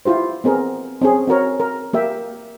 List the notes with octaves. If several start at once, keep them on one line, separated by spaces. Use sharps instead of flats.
E4 F4 G4 C5
B3 C4 G#4 A#4
C4 C#4 G#4
C4 F#4 A#4 C#5
A#4
A#3 G4 E5 G5